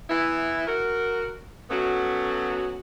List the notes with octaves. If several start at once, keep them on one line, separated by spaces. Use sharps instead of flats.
E3 B3 E4
F#4 A#4
F#3 A3 B3 C#4 F#4